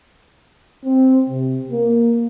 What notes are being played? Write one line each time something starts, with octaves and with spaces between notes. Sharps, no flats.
C4
C3
A#3